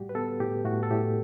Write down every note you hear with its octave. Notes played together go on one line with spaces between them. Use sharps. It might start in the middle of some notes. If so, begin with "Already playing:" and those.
Already playing: A2 G3 F#4 G4
B4
B3 A4
A2 G4
A2 F#4
A4
A2 G4